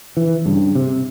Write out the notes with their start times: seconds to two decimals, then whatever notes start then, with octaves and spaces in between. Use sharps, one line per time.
0.17 E3
0.45 G2 C#3
0.75 C3